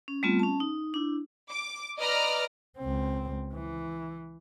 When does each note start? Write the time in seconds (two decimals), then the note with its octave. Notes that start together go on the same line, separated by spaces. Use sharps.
0.08 C#4
0.23 G3 A3 B3 C4 F4
0.39 C#4 A5
0.60 D#4
0.94 D4 E4
1.49 D6
1.98 B4 D5 D#5 A#5 D6 F6
2.78 C#2 C4
3.54 E3